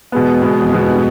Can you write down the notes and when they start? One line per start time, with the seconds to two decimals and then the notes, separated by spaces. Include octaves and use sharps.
0.12 E2 B2 G#3 B3
0.42 F2 B2 G#3 B3
0.73 G2 B2 G#3 B3